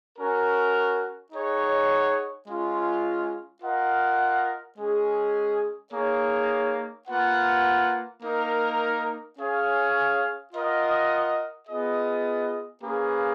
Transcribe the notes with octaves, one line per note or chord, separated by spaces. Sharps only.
C#4 F#4 A#4
D#4 G#4 C#5 F#5
G#3 C#4 F4
F4 A#4 D#5 F#5
G#3 C#4 G#4
A#3 D#4 G#4 C#5
A#3 F4 B4 F#5
A#3 D#4 A#4
C#4 G#4 C#5 F5
F4 A#4 D#5 F#5
B3 F4 G#4 D#5
A#3 C#4 G#4 B4 F5